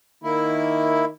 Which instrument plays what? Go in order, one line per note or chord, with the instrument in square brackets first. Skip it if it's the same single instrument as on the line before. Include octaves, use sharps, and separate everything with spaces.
[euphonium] D#3 [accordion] A#3 E4